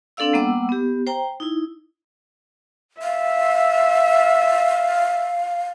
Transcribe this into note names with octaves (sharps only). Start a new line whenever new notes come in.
C4 D4 A4 D5 F5 E6
G3 A#3 B3 F#5 D6 E6
B3 G4
C5 G5 A#5
D#4 E4
E5 F5